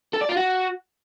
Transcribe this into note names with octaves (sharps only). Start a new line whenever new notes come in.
A4
D5
F4
F#4